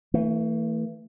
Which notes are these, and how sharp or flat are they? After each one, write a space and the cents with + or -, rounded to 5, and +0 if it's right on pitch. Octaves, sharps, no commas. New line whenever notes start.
E3 -15 A3 +35